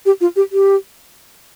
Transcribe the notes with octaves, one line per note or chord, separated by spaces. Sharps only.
G4
F4
G4
G4